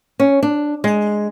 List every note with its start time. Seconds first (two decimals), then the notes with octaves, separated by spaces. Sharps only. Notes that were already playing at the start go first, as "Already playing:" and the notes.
0.20 C#4
0.43 D4
0.84 G#3